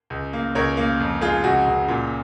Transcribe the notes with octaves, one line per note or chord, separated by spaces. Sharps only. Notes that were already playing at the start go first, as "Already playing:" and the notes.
C#2
A#3
C#2 A#4 C#5
A#3
F2
G#3 F4 G#4
C#2 F#4
C#2
A#2